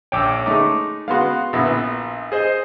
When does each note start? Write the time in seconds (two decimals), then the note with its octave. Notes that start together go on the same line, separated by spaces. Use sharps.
0.12 A#1 C#5 G5 D6 E6
0.46 G#3 A3 D#4 D6
1.08 G#3 B3 F#4 F5 C6
1.53 A#1 B3 E4
2.32 G#4 C5 D#5